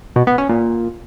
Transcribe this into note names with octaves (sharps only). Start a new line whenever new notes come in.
B2
B3
C#4
A#2